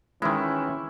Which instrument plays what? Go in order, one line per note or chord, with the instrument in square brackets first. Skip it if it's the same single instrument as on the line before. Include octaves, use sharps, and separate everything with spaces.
[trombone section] G#1 E3 C#4 [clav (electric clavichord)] D#3 G#3 [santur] E4